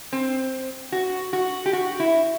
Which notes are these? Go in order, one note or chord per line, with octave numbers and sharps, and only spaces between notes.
C4
F#4
F#4
G4
F#4
E4